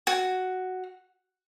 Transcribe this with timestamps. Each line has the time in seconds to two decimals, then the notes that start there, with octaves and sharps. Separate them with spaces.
0.07 F#4